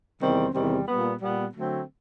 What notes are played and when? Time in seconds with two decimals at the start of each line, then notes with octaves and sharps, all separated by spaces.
0.21 E2 C3 D#3 G3 C4
0.53 E2 C3 D#3 G3 C4
0.88 A#2 G3 B3
1.20 A#2 G3 B3
1.54 D3 F#3 A3 C4